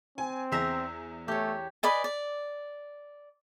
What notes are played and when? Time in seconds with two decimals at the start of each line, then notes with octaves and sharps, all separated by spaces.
0.18 C4 G#5
0.52 E2 G#4 C5 E5 A#5 A#6
1.28 A3 G4 C#5
1.83 B4 D5 D#5 G#5
2.04 D5